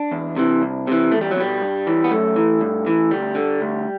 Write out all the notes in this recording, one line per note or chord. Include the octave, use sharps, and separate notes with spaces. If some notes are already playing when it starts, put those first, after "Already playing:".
Already playing: D4
E2
C3 E3
C2
C3 E3
E2 A3
G3
F#3
B2 G3
G2
E3
B3
F#2 A3
E3
G2
E3
D2 G3
D3
D2